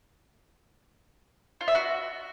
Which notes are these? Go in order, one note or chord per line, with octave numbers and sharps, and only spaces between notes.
F4
E5
F#4